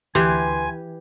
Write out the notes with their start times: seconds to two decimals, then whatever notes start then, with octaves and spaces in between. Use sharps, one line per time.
0.15 D2 E3 G4 G#5 C6